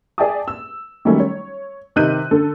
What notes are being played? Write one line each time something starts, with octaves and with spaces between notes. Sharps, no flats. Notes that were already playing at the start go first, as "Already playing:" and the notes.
G#4 D5 E5 G5 A5 D#6
E6
D#3 F#3 G3 A3 C#4
C#5
C3 D#3 D#4 F#6 G6 D#7
D3 A4